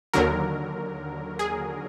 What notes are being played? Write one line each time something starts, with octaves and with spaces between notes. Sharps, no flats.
D#2 D3 F#3 A#4
G#4